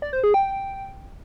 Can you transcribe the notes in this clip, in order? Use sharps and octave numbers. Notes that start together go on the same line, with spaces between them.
D5
C5
G#4
G5